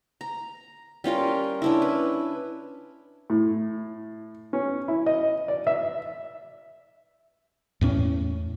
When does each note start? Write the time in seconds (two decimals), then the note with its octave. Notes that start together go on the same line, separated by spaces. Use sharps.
0.21 A#5
1.04 G3 C#4 F4 A#4
1.62 C#4 D4 E4
1.82 B4
3.30 A2
4.53 C#4
4.88 E4
5.06 D#5
5.48 D5
5.67 E5
7.81 E2 A2 C#4